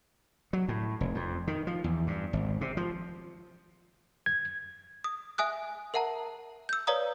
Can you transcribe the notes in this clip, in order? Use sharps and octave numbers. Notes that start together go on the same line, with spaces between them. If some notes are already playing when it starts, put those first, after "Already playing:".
F#3
A2
F1
F2
D#3
F3
E2
G2
G#1
C3
F3
G#6
D#6
E5 G#5 D#6 F#6
A#4 E5 F#5 A5 A#5
E6 G6
B4 C#5 D5 F5 A#5 D#6